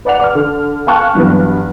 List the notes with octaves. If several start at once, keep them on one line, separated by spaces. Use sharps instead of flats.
B4 D5 F#5 F7
D6 F6
D3
F5 G5 A5 C#6 F6 F#6
G2 E3 F#3 B3